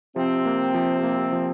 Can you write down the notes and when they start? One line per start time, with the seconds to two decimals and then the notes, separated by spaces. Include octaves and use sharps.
0.16 C3 F3 C4
0.45 A#3
0.74 F3
1.03 A#3
1.32 F3